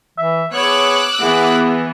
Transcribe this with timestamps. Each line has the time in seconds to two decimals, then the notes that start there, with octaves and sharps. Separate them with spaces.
0.18 E3 E5
0.54 B3 G#4 C#5 D6 E6 F#6
1.22 E3 B3 G#4 F#5